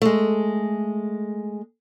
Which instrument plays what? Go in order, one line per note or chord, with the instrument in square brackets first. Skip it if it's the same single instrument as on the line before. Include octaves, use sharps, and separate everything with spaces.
[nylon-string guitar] G#3 A3